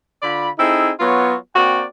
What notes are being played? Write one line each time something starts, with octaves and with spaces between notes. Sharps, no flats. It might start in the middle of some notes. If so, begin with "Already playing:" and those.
D3 F4 D5 B5
C4 D#4 E4 G#4 A4
F#3 B3 F4 F#4 C#5
A#3 C4 F#4 D5 G5